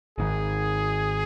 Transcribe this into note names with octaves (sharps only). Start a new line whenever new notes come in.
G#1 G#2 D#3 G#4